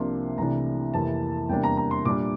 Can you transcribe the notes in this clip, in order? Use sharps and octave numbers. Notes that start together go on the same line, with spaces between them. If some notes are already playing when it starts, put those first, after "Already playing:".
Already playing: C2 C3 F3 A#3 D4 C6
C2 C3 E3 A3 D4 A#5
F2 C3 E3 A#3 A5
E2 C3 G3 A#3 D4 G5
A#5
A#5
C6
A#2 G3 D4 D6